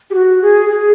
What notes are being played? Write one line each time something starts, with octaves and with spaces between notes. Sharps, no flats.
G4
F#4
G#4
G#4